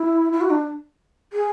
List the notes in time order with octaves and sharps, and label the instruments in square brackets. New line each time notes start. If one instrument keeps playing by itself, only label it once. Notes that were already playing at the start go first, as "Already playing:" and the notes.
Already playing: [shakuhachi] E4
E4
F#4
D4
G#4